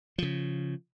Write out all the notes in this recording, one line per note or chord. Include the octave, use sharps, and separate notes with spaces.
C#3 F3